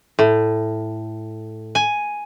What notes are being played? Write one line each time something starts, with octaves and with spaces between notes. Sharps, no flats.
A2
G#5